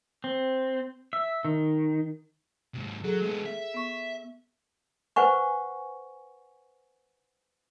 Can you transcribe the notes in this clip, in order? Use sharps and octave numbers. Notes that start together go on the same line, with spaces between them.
C4
E5
D#3
G#2 C3
F#3 G#4 A4
G#3 B3
E5
B3 C#6
B4 C5 F#5 G#5 C#6